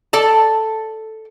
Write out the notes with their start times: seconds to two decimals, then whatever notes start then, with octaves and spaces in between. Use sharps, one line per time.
0.13 A4 D5 A5